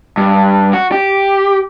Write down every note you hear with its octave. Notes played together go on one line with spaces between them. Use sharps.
G2
F#4
G4